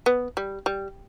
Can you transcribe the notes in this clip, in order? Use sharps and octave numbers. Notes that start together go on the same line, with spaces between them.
B3
G3
G3